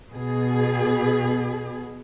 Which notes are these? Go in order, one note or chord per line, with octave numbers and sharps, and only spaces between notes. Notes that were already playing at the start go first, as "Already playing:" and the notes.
B2 G#4